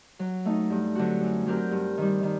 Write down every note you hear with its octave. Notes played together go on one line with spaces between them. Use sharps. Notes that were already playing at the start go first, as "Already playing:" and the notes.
F#3
A3 D#4
G2
D3 F#3 C4 F#4
F#2
F#3 C4 G4 A#4
G2
D#3 G3
D#3